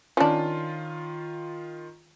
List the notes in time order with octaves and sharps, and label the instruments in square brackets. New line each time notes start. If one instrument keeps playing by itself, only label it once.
[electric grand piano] D#3 F4 [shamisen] C#4 D4